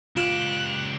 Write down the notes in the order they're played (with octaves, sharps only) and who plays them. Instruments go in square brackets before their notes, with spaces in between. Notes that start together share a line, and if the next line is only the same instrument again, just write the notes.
[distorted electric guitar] C#2 G4 [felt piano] F4 [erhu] F#6 [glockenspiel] D7 E7 F#7